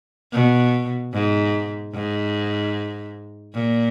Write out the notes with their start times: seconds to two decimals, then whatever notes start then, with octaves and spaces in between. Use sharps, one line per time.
0.33 B2
1.13 G#2
1.94 G#2
3.54 A#2